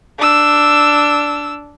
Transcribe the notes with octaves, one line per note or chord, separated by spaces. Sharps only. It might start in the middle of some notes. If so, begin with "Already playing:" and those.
D4 E6